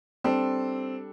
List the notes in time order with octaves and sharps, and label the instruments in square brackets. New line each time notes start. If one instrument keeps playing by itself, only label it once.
[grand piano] G3 D4 A4 [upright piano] C4